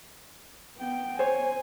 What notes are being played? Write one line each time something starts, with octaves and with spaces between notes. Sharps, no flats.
B3 G5
C5 C#5 G#5